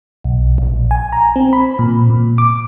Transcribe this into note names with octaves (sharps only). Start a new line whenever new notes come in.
B1
A#1
G#5
A#5
C4
B5
A#2
A#2
D6